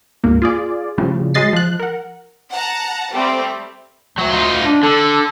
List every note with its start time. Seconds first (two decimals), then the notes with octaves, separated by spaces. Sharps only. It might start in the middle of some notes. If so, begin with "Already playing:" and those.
0.24 D2 G#2 A#3
0.42 F4 G#4 D5
0.98 A2 C#3 F3 G3
1.34 F#3 G#3 D#5 A6 C7
1.53 F3 F#6
1.80 A#4 F#5
2.51 F#5 A5 A#5
3.13 G3 A3 C4
4.18 D2 F#3
4.30 D#4 F4
4.66 D4
4.83 D3 A4